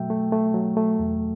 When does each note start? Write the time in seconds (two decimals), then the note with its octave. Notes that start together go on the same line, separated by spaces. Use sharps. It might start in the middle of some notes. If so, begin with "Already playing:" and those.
Already playing: B2 F#3 A3 E5 G5
0.10 A3
0.32 A3
0.54 F#3
0.77 A3
1.00 E2